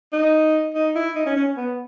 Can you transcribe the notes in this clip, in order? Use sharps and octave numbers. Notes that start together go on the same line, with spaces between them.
D#4
D#4
E4
D#4
C#4
C#4
B3